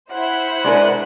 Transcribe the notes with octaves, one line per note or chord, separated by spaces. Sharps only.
E4 C5 F#5
G#3 D4 A#4 B4 D5